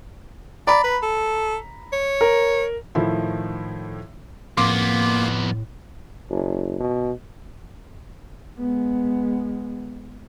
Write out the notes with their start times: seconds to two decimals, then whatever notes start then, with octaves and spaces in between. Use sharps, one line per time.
0.67 D5 A#5 B5
0.84 B4
1.03 A4
1.93 C#5
2.21 A#4
2.95 A2 D#3 F3 E4
4.57 F2 A2 A#3 B3 C6 D6
6.30 F#1
6.80 B2
8.59 G#3 B3